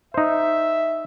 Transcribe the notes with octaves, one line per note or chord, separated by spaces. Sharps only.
D#4 C5 E5